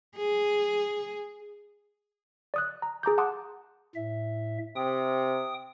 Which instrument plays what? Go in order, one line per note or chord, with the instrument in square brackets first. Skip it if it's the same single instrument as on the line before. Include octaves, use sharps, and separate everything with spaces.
[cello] G#4
[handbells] D5 D#6 F#6
A#5
G#4 A#5 D6 G6
F#5 A5 C6 D6 D#6 F#6
[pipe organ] A2 E5
[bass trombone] C3 [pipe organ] G5 D#6